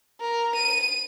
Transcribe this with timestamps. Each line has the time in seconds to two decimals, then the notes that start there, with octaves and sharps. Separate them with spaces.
0.20 A#4
0.55 D#7